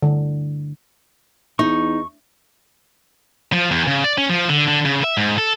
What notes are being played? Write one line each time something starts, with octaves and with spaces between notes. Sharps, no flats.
D3
E2 D#4 C#6
F3
E2
C#3
D5
C#4
F3
D3
D3
C#3
E5
G#2
A4